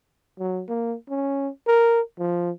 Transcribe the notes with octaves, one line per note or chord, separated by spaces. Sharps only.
F#3
A#3
C#4
A#4
F3